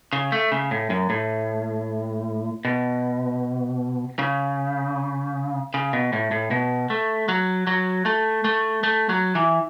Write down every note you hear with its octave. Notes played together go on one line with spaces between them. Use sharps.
C#3
A3
C#3
A2
F#2
A2
B2
C#3
C#3
B2
A2
A2
B2
A3
F#3
F#3
A3
A3
A3
F#3
E3